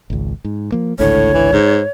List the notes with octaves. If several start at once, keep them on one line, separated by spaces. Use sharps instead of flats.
G#1 C#2
G#2
F3 A#3
G#1 C#2 A2 D3 C#5
E3
G#2